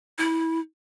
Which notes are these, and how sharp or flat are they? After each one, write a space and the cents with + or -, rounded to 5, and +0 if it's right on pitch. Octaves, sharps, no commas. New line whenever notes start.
E4 -20